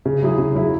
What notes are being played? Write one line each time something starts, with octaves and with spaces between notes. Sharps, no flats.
C#3
F#3 E4 G#4
C#3
F#3 E4 G#4